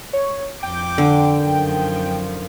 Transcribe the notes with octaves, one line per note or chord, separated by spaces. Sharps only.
C#5
F2 G5 D6
D3
F#2 D#3 F3